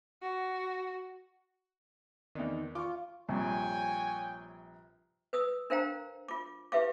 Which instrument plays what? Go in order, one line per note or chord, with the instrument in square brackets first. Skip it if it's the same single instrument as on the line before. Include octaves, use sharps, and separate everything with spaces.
[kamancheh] F#4
[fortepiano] E2 C4 D4 [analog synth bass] D#3
[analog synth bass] F4 [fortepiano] C#6 D6
[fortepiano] A#1 G2 C3 [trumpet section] C#5 G5 G#5
[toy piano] B4 D#6 E6
D4 A#4 C5 F5 G5 A#5
F4 D6
E4 G4 B4 E5 F5 D6